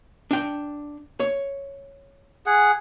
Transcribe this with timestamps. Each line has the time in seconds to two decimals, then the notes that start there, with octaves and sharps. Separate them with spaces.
0.31 D4 G5
1.20 C#5
2.46 G#4 F#5